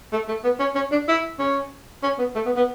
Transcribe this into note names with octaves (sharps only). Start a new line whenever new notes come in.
A3
A3
B3
C#4
C#4
D4
E4
C#4
C#4
B3
A3
B3
B3